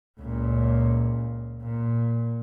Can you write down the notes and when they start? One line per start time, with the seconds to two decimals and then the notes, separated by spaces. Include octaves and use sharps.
0.20 C#2 A#2
1.62 A#2